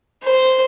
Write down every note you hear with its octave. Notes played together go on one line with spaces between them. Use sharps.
C5